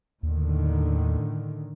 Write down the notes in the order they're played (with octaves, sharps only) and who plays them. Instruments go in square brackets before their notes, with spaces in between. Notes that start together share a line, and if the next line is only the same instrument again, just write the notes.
[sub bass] D#2 [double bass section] A2 D3 D#3